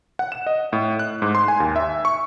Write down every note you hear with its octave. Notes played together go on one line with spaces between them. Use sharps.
F#5
E7
D#5
A2
F#6
G#2
C6
G#5
D#2
E5
C#6